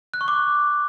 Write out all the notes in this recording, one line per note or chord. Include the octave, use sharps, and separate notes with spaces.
F#6
C#6
D6